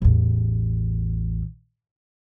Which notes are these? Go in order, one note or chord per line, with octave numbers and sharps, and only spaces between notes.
A1 E2